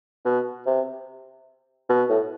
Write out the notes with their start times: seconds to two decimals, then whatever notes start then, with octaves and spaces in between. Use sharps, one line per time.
0.25 B2
0.66 C3
1.89 B2
2.09 A2